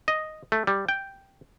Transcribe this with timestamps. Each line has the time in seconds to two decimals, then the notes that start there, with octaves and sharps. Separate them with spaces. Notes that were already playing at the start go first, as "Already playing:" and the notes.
0.08 D#5
0.52 A3
0.67 G3
0.89 G5